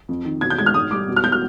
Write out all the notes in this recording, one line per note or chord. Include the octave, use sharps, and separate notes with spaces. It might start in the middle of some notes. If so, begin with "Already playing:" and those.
F2
D#3
B2 G#6
G6
G#3 G#6
F6
G#2 D#6
G3 D6
B2
F6
B2 G6
F6